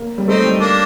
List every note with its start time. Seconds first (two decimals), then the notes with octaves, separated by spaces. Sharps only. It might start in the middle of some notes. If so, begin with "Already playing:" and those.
Already playing: A#3
0.18 G3
0.28 A3 C4 D#4
0.44 G3
0.58 A#3 D4